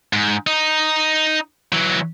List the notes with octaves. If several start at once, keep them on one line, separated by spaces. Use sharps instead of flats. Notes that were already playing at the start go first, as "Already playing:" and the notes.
G#2
D#4
E3 F#3